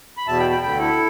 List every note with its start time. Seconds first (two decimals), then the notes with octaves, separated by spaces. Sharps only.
0.17 B5
0.27 E2 B2 E5 A5
0.39 G5 B5
0.50 G5 B5
0.62 D2 D3 G5 B5
0.79 E4 A4